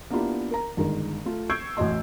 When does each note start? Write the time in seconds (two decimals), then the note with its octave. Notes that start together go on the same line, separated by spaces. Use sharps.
0.10 A#3 B3 D4 E4 F4 G4
0.51 A#4 A#5
0.77 G1 D#3 G#3 A#4
1.26 A3 F4
1.50 C#6 E6 G6 G#6 C7 D7
1.77 A1 E2 F#4 D#5 C6